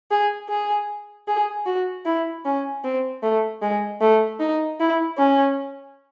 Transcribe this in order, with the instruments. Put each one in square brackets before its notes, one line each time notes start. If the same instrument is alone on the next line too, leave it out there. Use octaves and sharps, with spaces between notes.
[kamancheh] G#4
G#4
G#4
F#4
E4
C#4
C4
A3
G#3
A3
D#4
E4
C#4